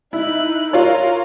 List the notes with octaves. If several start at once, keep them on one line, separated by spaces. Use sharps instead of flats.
D#4 E4 F#6
F4 A#4 C#5 A#5